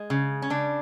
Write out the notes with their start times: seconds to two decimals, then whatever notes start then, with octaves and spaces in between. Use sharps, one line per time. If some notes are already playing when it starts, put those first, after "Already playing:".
Already playing: G#3
0.10 C#3
0.42 C#4
0.50 C#3 D4